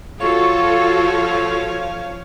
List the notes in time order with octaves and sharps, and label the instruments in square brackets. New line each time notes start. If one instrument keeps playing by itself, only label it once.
[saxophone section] F3 C#5 F5 [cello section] F4 F#4 A4 [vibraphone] C#6